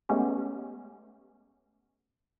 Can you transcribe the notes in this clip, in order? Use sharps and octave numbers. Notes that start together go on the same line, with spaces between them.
G#3 A3 B3 C#4 G4